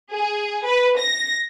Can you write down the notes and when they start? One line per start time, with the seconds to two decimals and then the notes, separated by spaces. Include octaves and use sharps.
0.12 G#4
0.65 B4
0.98 A#6